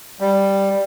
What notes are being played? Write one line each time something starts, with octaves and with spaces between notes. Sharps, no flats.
G3